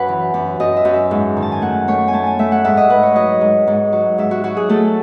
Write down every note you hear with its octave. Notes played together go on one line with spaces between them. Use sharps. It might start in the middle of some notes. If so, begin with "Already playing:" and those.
Already playing: F#2 B4 F#5 G#5
E3
F#2
F#2 D#5
E5
F#2
E5
G#2
D#3
A5
G#5
A3 F#5
A3 C#5
G#5
A3 A5
G#5
A3 E5
F#5
G#2 E5
D#5
G#2 B4
C#5
F#3 D#5
G#2
G#2
F#3
G#2 E5
F#4
F#3 F#4
G#4
A3 A4